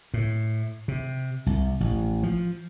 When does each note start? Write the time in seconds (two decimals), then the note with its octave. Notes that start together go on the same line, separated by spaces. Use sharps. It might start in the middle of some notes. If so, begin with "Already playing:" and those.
0.14 A2
0.88 C3
1.46 C2
1.80 A1
2.23 F3